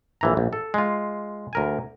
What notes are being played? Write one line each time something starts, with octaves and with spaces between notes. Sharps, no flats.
A#1 E3 A#5
A#1
A4
G#3 F4
D2 A#4 G#5